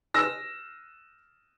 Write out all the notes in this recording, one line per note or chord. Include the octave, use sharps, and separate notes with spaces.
E6 A#6